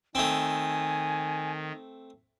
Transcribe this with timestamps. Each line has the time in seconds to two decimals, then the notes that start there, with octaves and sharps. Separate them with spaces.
0.15 D#3 A3 C4 G#5